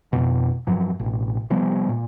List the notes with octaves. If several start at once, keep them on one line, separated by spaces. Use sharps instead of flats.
F2 B2
G2 F3 F#3
A1 B2
C3 F3 G3 B3
A#2